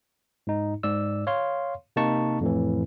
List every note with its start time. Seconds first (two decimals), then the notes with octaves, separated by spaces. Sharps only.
0.47 G#2 D#4
0.83 G#2 D5 E6
1.27 C#5 F5 C6
1.96 C3 A#3 D#4 A5 C#6
2.41 F2 A2 E3